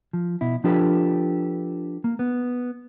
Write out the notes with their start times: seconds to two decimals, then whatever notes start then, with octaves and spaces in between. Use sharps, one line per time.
0.13 F3
0.41 B2 E4
0.64 F3 D4 F4 G4 A4 B4
2.04 A#3
2.19 B3